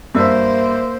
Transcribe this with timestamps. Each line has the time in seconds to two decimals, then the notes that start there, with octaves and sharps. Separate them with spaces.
0.15 G2 A#3 C5 E5